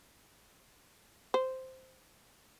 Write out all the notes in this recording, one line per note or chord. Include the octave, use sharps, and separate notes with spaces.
C5